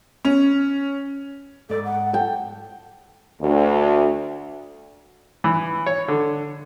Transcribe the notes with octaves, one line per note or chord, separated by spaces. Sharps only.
C#4
G#2 A4 D5
F#5
A4 G5
D2
E3
C#5
D3